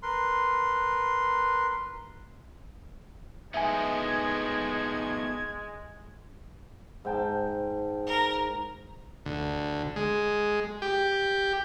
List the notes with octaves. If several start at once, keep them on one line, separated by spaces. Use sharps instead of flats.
A#4 B4 C6
G#3 A3 B3 D#4 E5 G#5 G#6
G#2 G5 A5
A#4
D2
G#3
G4